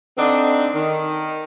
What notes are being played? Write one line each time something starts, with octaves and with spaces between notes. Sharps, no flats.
D3 C4 D4 D#4
D#3